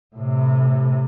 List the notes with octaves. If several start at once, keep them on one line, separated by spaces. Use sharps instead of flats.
A2 C3